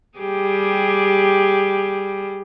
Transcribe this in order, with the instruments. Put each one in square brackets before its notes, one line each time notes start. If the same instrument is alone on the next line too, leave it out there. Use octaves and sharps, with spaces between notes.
[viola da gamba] G3 G4 G#4